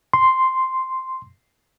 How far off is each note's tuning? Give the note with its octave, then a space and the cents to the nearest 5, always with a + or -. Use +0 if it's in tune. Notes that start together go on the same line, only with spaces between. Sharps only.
C6 +0